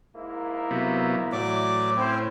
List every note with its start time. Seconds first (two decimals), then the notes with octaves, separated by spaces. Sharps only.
0.14 G#2 A#3 E4
0.71 C3 F#3 B3
1.33 A2 E3 F#3 D5 D6
1.96 C4 C#4 E4 C5